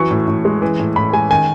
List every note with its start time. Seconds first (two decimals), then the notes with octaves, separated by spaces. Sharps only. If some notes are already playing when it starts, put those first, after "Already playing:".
Already playing: E3 F#3 C#6
0.11 A2
0.28 A2
0.45 G#3
0.62 E3
0.79 A2
0.96 A2 B5
1.13 G#3 G#5
1.30 D#3 G#5